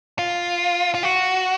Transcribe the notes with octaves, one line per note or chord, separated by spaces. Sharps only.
F4
F4
F#4